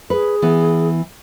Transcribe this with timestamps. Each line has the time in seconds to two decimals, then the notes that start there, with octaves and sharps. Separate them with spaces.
0.10 G#4 B4
0.42 E3 B3